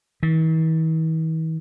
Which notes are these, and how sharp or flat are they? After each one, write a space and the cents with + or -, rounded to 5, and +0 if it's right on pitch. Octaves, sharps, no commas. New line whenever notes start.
E3 -45